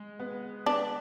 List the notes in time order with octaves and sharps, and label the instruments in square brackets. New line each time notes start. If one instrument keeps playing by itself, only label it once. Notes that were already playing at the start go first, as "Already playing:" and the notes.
Already playing: [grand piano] G#3
B3
[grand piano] B3 [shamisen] D4